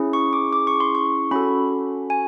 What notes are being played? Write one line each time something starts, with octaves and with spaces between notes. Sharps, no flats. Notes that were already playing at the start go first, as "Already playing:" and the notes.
Already playing: C#4 E4 G#4
C#6
D6
D6
C#6
C6
C#6
C#4 F#4 A4 B5
G#5